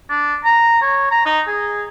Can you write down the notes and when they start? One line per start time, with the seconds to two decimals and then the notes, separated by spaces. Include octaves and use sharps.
0.10 D4
0.45 A#5
0.82 C#5
1.11 A#5
1.26 D#4
1.47 G#4